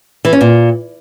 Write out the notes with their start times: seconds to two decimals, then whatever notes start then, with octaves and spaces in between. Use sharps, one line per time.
0.25 E3
0.33 C#4
0.41 A#2